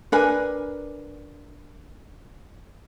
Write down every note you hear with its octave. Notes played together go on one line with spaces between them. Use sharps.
D4 A#4 B4 G#5